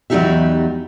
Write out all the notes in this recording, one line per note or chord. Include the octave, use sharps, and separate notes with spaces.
E2 F#3 G3 D#4 G4 E5